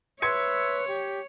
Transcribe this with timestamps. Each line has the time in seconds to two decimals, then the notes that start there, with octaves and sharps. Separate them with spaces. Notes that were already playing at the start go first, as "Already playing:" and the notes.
0.22 B4 C#5 E5 C6 G#6 C#7
0.88 G4